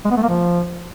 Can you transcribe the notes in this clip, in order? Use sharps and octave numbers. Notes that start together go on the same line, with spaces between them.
G#3
B3
A3
A#3
F3